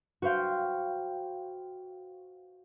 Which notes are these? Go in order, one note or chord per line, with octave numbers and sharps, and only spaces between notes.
F#4 B4 C5 F5 G5